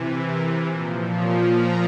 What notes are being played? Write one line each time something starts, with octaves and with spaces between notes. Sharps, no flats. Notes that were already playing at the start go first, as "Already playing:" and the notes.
Already playing: C3 E3
A#4
A#2 F3 C5
C#5
A#5